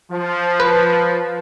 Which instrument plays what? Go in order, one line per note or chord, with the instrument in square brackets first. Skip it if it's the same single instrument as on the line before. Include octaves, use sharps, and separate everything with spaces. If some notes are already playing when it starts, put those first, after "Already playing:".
[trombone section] F3
[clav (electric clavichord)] B4